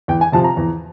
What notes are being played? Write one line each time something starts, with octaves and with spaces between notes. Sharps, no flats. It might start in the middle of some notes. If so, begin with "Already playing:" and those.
E2 G5
G#5
C3 F3 A5
A#5
E2